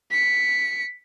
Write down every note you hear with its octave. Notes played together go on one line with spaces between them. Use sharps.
B6 C#7